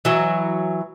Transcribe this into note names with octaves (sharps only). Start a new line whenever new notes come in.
E3 F#3